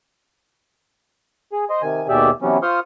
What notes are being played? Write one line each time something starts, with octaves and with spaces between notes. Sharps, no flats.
G#4
C5 D#5
C3 D#3 G#5
D#2 B2 G4 G#4 D5 E5
C3 E3 F#3 G3 B3 C#4
F4 C5 C6 C#6 D#6 F6